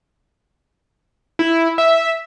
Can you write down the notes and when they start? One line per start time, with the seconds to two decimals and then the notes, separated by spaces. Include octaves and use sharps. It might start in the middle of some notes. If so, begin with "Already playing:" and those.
1.39 E4
1.78 E5